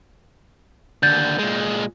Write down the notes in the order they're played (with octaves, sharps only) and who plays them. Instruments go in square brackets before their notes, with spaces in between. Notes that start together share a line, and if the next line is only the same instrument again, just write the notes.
[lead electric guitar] D#2 D3 [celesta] G6 A6
[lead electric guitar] A#2 G#3